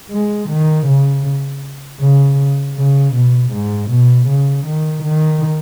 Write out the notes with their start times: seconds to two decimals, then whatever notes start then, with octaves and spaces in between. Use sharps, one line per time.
0.11 G#3
0.49 D#3
0.87 C#3
2.00 C#3
2.76 C#3
3.14 B2
3.52 G#2
3.90 B2
4.27 C#3
4.66 D#3
5.03 D#3